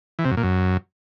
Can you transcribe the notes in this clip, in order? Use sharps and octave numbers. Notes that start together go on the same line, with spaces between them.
E3
C3
F#2
A#2
F#2